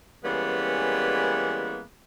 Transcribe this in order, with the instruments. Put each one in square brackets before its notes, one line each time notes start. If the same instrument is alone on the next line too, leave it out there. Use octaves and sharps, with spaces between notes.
[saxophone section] E3 G3 G#3 A#3 B3 C#4